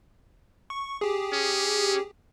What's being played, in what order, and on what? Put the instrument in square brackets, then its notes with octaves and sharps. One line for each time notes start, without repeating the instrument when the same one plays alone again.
[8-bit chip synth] C#6
G4 G#4
[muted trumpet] C#4